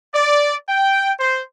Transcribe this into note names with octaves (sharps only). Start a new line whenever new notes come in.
D5
G5
C5